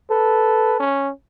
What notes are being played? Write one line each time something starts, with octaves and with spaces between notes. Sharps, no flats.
A4 B4
C#4